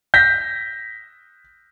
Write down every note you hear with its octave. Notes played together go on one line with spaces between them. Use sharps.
G6 A#6 B6